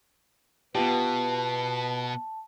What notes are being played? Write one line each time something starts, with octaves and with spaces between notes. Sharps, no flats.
B2 B3 F4 G4 B4 A5